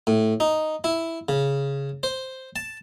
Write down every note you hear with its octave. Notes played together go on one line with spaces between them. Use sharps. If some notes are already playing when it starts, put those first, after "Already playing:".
A2
D#4
E4
C#3
C5
A5